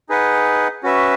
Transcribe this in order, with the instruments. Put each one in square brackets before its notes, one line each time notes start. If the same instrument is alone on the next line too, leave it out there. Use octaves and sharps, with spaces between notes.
[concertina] D#4 G#4 B4 D#5 F#5
C#4 F#4 B4 E5